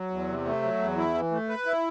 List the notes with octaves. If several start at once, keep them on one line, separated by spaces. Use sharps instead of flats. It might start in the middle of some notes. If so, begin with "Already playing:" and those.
Already playing: F#3
E2
C3
A3
F#3
E2
E4
E3
A3
B4
E4